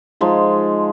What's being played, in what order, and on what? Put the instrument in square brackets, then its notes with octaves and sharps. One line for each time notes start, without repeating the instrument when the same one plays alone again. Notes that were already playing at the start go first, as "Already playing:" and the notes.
[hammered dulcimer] F3 G#3 D#4